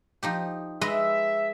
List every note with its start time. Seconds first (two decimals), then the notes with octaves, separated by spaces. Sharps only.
0.23 F3 D#4 G4
0.81 G#3 B4 D#5 E5